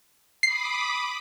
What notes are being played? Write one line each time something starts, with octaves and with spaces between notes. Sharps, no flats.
B5 D6 D#6 C7